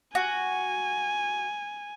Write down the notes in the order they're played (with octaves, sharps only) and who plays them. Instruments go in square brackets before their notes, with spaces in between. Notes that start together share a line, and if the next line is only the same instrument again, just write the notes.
[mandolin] F#4 [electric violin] G#5